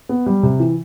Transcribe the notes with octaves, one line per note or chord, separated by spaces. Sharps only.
B3
G3
C3
E3